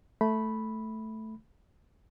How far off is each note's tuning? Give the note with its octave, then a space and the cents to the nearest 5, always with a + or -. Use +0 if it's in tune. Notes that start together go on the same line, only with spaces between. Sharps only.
A3 +0 B5 -5